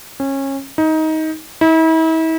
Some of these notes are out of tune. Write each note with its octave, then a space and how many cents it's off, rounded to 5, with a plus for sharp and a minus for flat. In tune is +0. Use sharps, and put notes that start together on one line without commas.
C#4 -25
D#4 +20
E4 -40